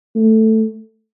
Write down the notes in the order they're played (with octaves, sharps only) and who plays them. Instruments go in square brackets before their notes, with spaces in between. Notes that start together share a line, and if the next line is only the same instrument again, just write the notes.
[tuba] A3